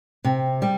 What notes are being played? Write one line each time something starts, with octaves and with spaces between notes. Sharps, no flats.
C3
G3